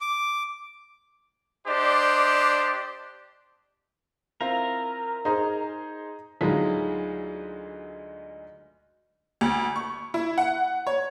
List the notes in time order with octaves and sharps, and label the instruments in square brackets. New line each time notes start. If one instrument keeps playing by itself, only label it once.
[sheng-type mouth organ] D6
[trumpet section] D4 G4 C5 D5 D#5
[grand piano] C4 E4 F4 [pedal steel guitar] A#4
[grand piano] D#4 G#4 C5 [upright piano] D#5 A#5
[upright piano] D2 F#3 G#3 D#4 F4 B6
[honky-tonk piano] D2
C#6
E4
F#5
C#5